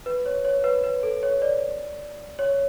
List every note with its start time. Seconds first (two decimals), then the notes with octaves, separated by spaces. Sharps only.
0.06 B4
0.26 C#5
0.45 C#5
0.64 B4
0.84 B4
1.03 A4
1.23 C#5
1.42 D5
2.39 C#5